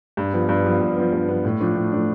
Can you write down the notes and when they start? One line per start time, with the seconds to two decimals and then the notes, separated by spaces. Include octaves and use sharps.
0.17 G2
0.33 F3 B3
0.49 G2
0.66 F3 B3
0.81 G2
0.96 F3 B3
1.13 G2
1.28 F3 B3
1.45 A2
1.61 F3 A3 D4
1.76 A2
1.92 F3 A3 D4